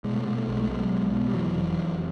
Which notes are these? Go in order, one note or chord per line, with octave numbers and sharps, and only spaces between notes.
B2 G#3
A3
B2 G#3
A3
B1 G#3
A3
B2 F#3 G#3
B1
B2
G3
F1 E3 F#3
F1
F1